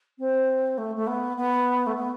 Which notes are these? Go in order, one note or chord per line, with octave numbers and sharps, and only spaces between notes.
C4
A3
A3
B3
B3
A3
B3